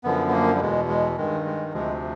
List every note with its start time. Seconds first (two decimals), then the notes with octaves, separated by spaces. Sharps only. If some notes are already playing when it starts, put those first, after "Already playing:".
0.04 F#2 D3 F3 B3
0.27 B3
0.32 A#3
0.55 G3
0.60 E2 B2 G#3
0.88 G#3
1.17 G2 D#3 G#3
1.45 G#3
1.73 D2 C3 F3 G#3